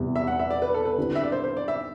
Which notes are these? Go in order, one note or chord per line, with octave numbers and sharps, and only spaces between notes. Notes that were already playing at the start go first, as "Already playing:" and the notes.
Already playing: E2 C3 G3
E5
F#5
E5
D5
B4
A4
B4
D3 G3 C4 E4
E5
D5
C5
C5
D5
E5